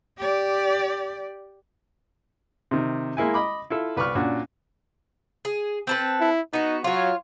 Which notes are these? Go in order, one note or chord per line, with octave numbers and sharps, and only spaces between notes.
G4 D5
C3 D#3
G#3 A#3 E4 G#5
D#5 B5 D6
E4 F4 A4
C2 B4 D5 B5 C#6 F6
A#2 C#4 D4 F#4 D5
G#4
C4 A4 B4
E4
B3 D#4 F#4
F#3 F4 C#5